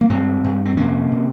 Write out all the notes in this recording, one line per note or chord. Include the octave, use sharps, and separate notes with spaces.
A#3
G2 G#3 C4
G2
C4
F2 C3 A#3 C#4
C3